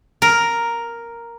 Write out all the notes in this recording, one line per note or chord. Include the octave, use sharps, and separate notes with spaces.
A#4